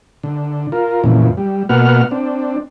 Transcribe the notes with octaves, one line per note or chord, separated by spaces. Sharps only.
D3
F4 A#4
F2 A#2 C#3 E3
G3
B2 A#3 B3 F#4 F#5 F6
C4 D4